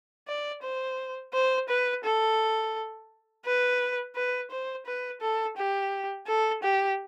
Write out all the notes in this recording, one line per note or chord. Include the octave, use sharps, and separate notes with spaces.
D5
C5
C5
B4
A4
B4
B4
C5
B4
A4
G4
A4
G4